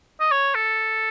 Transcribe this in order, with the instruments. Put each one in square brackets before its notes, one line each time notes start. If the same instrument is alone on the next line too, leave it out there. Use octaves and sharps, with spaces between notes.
[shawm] D#5
C#5
A4